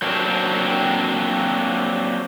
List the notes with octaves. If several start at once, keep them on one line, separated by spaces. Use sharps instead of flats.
F#3 A#3 C4 D4